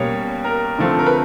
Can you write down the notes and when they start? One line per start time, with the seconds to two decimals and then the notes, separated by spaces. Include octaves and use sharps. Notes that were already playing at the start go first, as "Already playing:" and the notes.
Already playing: B2 G3 A#3 C#4 C#5
0.44 A#4
0.79 D3 F3 A3 C4
0.99 A#4
1.06 B4